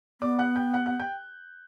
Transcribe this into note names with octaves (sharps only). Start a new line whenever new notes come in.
B3 D5 D6
F#5 F#6
G5 G6
F#5 F#6
F#5 F#6
G5 G6